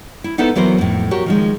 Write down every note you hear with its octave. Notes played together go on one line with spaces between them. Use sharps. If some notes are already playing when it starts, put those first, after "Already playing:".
E4
B3 D#4 E4 A4 B4 C5
E3 F#3 B3 A#4 C5
F2 A2
F#4 G4 A#4 C#5
D#3 F3 G#3